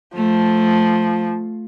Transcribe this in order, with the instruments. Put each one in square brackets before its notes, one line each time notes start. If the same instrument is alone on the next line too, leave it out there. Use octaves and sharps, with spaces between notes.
[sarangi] F3 [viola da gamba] A3